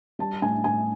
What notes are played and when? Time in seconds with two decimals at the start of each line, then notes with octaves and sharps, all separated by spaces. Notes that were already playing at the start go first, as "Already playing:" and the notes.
0.19 G3 A5
0.42 A2 G#5
0.64 A2 G#5